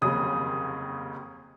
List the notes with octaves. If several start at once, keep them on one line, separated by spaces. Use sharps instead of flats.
F1 D#2 C#3 F#3 D#6